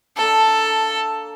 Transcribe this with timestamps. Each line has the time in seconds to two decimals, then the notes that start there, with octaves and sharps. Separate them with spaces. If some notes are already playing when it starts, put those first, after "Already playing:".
0.17 A#3 D4 A4 A5